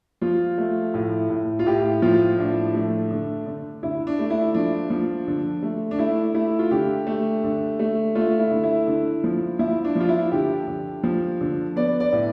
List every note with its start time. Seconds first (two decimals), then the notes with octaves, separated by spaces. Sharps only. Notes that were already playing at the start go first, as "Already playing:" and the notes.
0.21 F3 F4
0.58 A3
0.94 A2
1.30 A2
1.59 F4
1.66 A2 G4
2.02 F3 F4
2.38 A2 D4
2.74 A3
3.11 D3
3.46 D3
3.83 D3 E4
4.07 D4
4.19 A3
4.30 E4
4.54 F3 D4
4.90 F3
5.27 D3
5.63 A3
5.91 D4
5.99 A3 E4
6.34 A3 E4
6.59 F4
6.71 D3 G4
7.07 A3
7.44 D3
7.79 A3
8.15 A3 F4
8.39 E4
8.51 D3
8.63 E4
8.87 D3
9.24 F3
9.59 F3 E4
9.84 D4
9.96 F3 F4
10.09 E4
10.31 D3 G4
10.67 D3
11.04 F3
11.41 D3
11.76 B3 D5
12.00 D5
12.13 A2